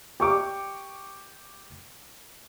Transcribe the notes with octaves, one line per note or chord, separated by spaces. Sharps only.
G4 C#6 D6